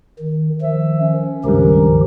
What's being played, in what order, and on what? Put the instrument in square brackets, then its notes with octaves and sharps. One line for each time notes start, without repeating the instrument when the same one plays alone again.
[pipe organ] D#3
[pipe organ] D#3 F3 [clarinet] E5
[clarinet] C#4
[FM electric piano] C#2 G2 [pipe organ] D#3 F3 G4 [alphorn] A#4